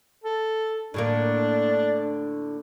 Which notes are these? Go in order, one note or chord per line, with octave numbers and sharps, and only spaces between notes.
A4
A2 D3 A#3 D4